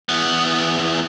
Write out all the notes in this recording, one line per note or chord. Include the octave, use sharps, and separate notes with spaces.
E2 B3